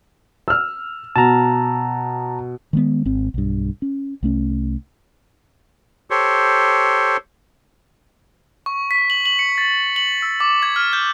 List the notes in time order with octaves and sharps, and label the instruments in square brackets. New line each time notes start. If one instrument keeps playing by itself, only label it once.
[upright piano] E6 F6
[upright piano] B2 [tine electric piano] A5 A#5
[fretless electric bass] D#3 G#3 B3
G#1 C4
B1 G2
C#4
C2 A3 C#4
[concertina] G4 A4 C5 C#5
[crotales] C#6
B6
F#7
F#7
C#7
A6
F#7
E6
D6
G#6
F6
G6